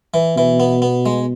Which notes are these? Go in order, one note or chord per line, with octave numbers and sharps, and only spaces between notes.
E3
B2 E3
B3
B3
G#3